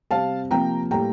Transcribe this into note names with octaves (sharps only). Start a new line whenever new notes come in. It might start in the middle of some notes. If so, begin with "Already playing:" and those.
C3 G3 C4 F5 A5
C3 F3 A#3 G5 A#5
A2 G3 A#3 G5 A#5